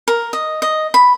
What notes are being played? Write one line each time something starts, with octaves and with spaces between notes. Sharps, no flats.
A#4
D#5
D#5
B5